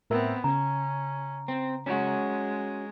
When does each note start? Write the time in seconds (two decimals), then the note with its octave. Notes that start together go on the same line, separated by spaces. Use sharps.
0.10 A2 B3 C4 A#4 E5
0.44 C#3 C#4 A#5
1.48 C4
1.86 G#3 C#4 F#4